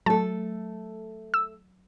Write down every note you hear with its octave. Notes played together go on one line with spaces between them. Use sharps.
F#3 A3 A4 A5
E6